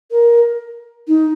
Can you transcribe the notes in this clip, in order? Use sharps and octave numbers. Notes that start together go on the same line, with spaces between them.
A#4
D#4